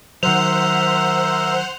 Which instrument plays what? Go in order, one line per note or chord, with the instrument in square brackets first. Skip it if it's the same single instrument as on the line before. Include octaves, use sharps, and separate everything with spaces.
[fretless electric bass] D#3 F#3 [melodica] A#4 E5 [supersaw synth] C5 F#5 [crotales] F7